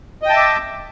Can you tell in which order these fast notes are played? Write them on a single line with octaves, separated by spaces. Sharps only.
D#5 G5 A5 E5 D6